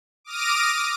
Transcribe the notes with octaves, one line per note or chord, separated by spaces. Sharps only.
D6 D#6 F6 A#6 D7 D#7